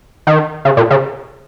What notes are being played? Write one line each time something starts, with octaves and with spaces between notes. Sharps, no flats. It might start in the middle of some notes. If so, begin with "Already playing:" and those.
D#3
C#3
A#2
C#3